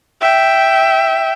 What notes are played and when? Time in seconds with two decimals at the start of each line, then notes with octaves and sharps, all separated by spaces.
0.21 E5 G5